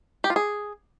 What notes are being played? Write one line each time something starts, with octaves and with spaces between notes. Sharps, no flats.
G4
F4
G#4